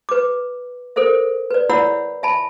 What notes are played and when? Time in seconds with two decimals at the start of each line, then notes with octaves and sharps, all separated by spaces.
0.09 B4 D6
0.96 A4 A#4 C5 E5
1.51 B4 D5
1.69 E4 C#5 D5 F#5 B5 E6
2.23 E5 G#5 A5 B5